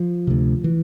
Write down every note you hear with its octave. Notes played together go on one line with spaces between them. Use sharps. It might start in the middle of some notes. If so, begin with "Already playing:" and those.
Already playing: F3
D2 C3
E3